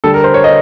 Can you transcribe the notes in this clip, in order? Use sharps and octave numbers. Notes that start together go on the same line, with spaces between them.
D3 G3 A4
A#4
C5
C#5
D#5